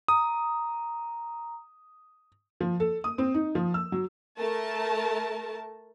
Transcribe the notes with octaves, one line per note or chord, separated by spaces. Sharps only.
A#5 D#6
F3
A4
D#6
C4
D#4
F3
E6
F#3
A3 A#4 A5